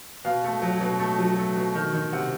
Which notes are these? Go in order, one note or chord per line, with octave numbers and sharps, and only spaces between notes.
B2 F5
A3
F#3
B2
A3
F#3
A3
B2
D#3
D#3
C3 F#5